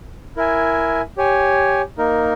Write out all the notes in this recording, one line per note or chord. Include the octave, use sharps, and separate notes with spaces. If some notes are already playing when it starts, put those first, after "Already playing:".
E4 A#4 E5 G#5
G4 C#5 G#5
A#3 D#4 A#4